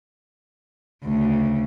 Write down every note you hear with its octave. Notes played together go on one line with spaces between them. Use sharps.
D2 C#3